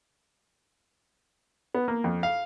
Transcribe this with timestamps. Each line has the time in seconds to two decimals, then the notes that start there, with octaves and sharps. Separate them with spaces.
1.74 B3
1.88 A#3
2.04 F2
2.23 F5